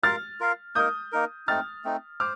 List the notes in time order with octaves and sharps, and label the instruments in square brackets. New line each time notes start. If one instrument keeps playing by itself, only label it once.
[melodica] F4 A#4 F5 [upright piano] F6 A6
[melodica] F4 A#4 F5
[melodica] A#3 D#4 A#4 [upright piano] D#6 G6
[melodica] A#3 D#4 A#4
[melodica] A3 C4 D#4 [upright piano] F6 A6
[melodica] A3 C4 D#4
[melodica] C5 [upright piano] D6 F6